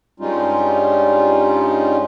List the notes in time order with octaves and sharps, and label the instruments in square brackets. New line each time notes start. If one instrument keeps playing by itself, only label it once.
[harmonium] G2 G3 G#3 C#4 D#4 F4